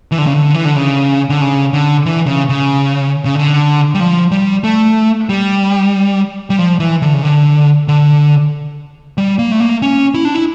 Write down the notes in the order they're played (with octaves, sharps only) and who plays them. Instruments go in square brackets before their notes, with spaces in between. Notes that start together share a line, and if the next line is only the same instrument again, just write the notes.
[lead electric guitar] E3
D3
C#3
D3
E3
D3
C#3
D3
C#3
D3
E3
C#3
C#3
C#3
D3
G3
F3
G3
A3
G3
G3
F3
E3
D3
C#3
D3
D3
G3
A#3
A3
A#3
C#4
E4
D4
E4